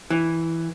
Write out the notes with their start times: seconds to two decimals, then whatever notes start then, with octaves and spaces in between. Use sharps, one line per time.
0.10 E3